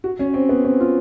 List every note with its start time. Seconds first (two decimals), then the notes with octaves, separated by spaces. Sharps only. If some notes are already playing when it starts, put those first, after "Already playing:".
0.04 F#4
0.19 C#4
0.34 C4
0.49 B3
0.65 C4
0.80 F4